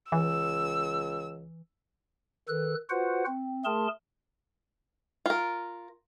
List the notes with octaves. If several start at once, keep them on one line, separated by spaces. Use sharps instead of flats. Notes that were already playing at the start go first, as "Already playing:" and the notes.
C#2 E3 E6
D#3 A4 B4 F#6
F4 F#4 B4 C5 F#5
C4
A3 G#4 A#4 A5 C6
F4 A#4